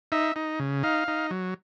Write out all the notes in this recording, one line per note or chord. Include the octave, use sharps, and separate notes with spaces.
D#4 E5
D#4
C#3
D#4 F5
D#4
F#3